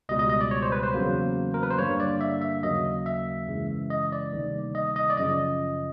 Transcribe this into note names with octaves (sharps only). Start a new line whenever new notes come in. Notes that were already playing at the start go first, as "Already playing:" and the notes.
C#2 B2 G3 D#5
D#5
D#5
D5
C#5
C5
B4
C5
E2 C#3 F#3 A#3
A#4
B4
C5
G2 D3 G3 A#3 C#5
D5
E5
E5
D#2 C#3 F#3 A#3 D#5
E5
F#2 C#3 E3 G#3
D#5
D5
D2 C3 D#3 G3 A#3
D#5
D#5
D5
F#2 C#3 F3 D#5